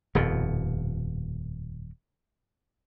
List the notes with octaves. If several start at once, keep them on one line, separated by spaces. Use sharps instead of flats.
D#1 F2 B2